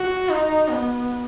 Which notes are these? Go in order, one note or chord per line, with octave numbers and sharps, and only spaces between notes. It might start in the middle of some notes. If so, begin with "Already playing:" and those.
Already playing: F#4
D#4
B3